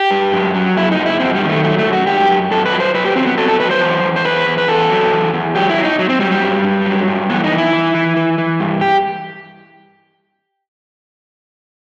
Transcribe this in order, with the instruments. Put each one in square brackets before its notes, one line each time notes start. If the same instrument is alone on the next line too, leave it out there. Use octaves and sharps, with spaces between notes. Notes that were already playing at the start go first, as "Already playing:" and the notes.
Already playing: [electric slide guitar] G4
G2
F#2
F#3
F#2 E4
D#4
F#2
E4
F#2 C4
G3
D#3
A3
F#3 A3
A3
F#2
F#4
F#2 G4
F#2
F#2 A4
B4
F#3
C5
F#3 B4
G4
F#3 C4
B3
F#3 A4
A4
F#3 B4
C5
E2
E2
C5
E2 B4
E2
B4
E2 A4
F#3
E2
E2
F#3 G4
E4
F#3
D#4
F#3
C4
F#3 G3
G3
G2
G2
F#3
G2
E3 B3
D#4
E3
E4
E3
E3
E3
E3
G2
G4